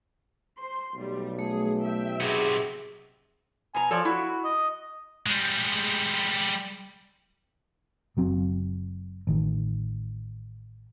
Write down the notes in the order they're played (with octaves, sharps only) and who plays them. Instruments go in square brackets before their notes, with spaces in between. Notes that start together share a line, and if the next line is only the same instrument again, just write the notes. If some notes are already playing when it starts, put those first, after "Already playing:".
[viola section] C5 C6
[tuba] B1 [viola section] G3 A3
[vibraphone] A3 [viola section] G#4
[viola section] E5 G5
[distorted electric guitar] C3 B3 [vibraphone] G#4
[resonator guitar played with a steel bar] B2 A#5 [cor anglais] G#5
[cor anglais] F3 [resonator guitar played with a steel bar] A4 C#5 D5
[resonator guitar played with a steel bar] E4 [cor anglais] F#4
[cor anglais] D#5
[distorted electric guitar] G3 G#3
[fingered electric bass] F#1 F#3 C4
A1 D#3